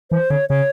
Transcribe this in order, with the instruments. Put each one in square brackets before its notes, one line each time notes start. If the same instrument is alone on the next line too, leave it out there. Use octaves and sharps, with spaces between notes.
[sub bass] E3 [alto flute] C5
[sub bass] D3 [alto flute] C#5
[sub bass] C#3 [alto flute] C#5